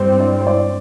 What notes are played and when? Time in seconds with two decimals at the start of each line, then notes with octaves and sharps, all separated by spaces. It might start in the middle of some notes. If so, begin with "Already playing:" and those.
Already playing: G2 G3 C4 C5
0.20 D5
0.41 C5
0.47 D5